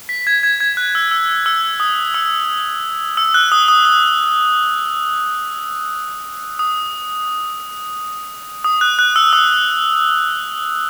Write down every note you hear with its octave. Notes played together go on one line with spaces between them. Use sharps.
B6
G#6
G#6
G#6
F#6
E6
E6
E6
D#6
E6
E6
F#6
D#6
D#6
D#6
D#6
D#6
F#6
F#6
E6
D#6